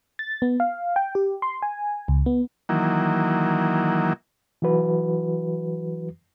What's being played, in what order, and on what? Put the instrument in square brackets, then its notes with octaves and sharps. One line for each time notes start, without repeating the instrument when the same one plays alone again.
[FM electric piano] A6
B3
F5
G5
G4
C6
G#5
C#2
B3
[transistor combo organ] D#3 E3 F#3 A#3
[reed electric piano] E3 F#3 F#4 B4